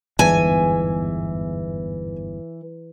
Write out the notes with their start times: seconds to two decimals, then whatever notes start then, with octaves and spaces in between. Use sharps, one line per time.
0.19 G1 E2 G#2 E3 G#5